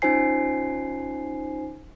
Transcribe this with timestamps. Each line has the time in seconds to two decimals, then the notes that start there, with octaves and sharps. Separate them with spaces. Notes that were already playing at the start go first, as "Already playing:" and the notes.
0.02 C#4 D#4 F4 C5 G#5 C7